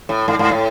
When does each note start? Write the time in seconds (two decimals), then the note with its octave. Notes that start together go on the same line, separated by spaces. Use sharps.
0.09 A2
0.28 G#2
0.39 G#2
0.51 A2